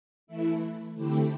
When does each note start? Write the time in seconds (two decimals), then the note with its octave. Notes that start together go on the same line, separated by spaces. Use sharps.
0.27 E3 A3 E4
0.95 D3 A3 C4 E4 G4